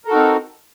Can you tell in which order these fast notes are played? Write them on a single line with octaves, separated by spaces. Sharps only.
A#4 A4 F#4 D#4 C4